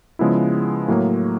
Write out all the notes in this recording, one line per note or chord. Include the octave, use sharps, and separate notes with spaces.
C#3 F3 G#3 B3 E4
A2 F#3 A#3